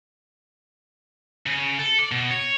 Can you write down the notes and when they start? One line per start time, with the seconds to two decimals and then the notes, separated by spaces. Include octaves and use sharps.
1.46 C#3
1.79 A4
1.99 D5
2.12 B2
2.31 C#5